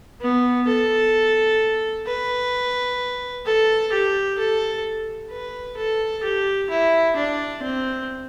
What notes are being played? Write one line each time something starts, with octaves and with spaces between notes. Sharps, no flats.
B3
A4
B4
A4
G4
A4
B4
A4
G4
E4
D4
C4